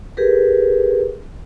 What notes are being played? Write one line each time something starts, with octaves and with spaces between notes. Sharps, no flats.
G4 G#4 A#4 B4